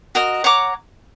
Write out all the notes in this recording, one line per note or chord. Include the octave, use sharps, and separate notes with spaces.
F#4 A#4 D#5
C#5 F#5 A#5 D6